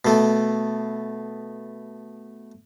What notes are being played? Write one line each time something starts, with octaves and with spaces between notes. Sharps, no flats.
B2 A3